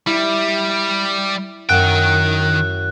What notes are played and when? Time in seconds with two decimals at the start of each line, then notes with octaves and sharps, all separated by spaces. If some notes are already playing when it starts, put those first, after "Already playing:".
0.07 G3 E4
1.69 F#2 D#3 F#5 G5 F#6